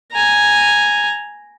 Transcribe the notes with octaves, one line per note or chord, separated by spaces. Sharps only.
G#5 A#5